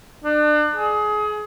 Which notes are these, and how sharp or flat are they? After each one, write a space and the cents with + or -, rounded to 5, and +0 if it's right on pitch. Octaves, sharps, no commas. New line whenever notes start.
D4 +35
G#4 +25